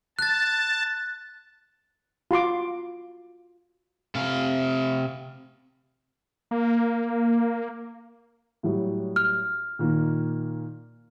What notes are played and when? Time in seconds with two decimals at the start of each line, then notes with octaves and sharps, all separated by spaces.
0.19 A5 F#6 A6
2.31 F4 F#4 C6 D6
4.15 C3 F5
6.51 A#3
8.63 A2 F#3 G3
9.16 F6
9.79 A#2 D#3 A#3